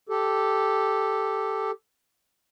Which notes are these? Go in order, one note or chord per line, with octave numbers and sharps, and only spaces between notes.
G4 A4